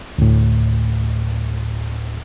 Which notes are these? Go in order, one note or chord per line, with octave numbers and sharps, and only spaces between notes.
D2 A2